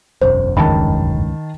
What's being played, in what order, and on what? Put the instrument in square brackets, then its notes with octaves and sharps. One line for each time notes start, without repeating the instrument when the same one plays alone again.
[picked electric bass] E1 B1 F#2 [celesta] C5
[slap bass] C#2 G2 [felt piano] D#3 A5 [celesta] B5